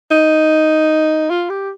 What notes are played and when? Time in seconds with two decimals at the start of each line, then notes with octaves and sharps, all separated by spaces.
0.11 D#4
1.30 F4
1.50 G4